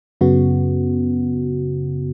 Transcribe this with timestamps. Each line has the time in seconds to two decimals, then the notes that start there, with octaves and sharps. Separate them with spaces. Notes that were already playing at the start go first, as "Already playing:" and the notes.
0.21 F#2 C#3 B3 F#4